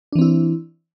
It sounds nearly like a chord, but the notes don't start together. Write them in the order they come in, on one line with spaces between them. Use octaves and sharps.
D4 E3 C4 E4